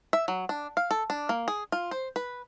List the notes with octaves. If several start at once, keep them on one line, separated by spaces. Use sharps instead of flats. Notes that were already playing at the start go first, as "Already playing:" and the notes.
E5
F#3
D4
F5
A4
D4
A#3
G#4
F4
C5
B4